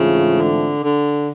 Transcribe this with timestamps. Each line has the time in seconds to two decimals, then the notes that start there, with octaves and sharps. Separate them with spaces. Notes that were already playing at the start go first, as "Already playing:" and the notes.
Already playing: G#2 C#3 E3 A3 C4 F4
0.41 D3
0.84 D3